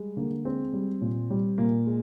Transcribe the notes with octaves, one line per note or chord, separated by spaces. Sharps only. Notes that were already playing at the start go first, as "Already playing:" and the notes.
Already playing: G3 G#3
D3 A#3
G#3 C4
G3
A#2
G3
A#2 A#3
G#3